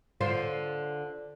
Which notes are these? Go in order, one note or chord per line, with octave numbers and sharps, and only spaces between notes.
D3 F4 C5